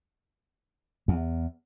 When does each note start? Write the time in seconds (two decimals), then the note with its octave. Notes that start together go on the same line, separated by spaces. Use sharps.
1.08 E2